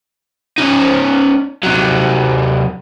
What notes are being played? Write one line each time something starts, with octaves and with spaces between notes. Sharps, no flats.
C#4 D#4
C3 F#3